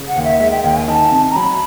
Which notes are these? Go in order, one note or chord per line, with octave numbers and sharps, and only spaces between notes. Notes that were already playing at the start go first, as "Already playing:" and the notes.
Already playing: C#3
F#5
D#2
E5
G#3 E5
G5
D#2 G5
G#5
D#3 A5
C3
A#5
F#3 B5